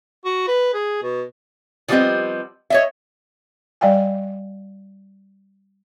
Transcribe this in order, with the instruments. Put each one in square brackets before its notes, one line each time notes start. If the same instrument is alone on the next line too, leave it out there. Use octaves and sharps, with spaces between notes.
[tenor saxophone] F#4
B4
G#4
B2
[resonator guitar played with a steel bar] D#3 F3 G3 B3 C4 D#5
C#5 D#5 E5
[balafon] G3 D5 F5 G5 G#5